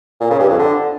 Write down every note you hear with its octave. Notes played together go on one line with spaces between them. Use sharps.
A#2
C#3
G2
F2
D3